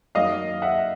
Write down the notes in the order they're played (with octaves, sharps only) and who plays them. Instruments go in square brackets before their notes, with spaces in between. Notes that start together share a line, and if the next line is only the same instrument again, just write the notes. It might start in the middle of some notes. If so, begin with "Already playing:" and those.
[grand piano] F#2 D#3 F#3 A#3 D#5 F5
E5 F#5